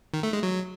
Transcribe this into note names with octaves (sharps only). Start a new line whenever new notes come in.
D#3
A3
G#3
F#3